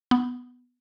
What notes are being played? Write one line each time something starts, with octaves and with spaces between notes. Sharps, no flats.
B3